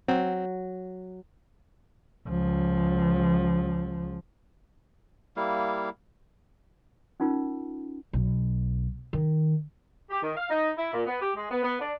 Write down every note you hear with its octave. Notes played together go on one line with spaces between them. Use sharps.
F#3 C4
C#2 F3
G3 A#3 E4 F5
C#4 D#4 F4 A#4
B1
D#3
G4
D#3
F5
D#4
E4
A#2
B3
G4
G#3
B3
B3
D4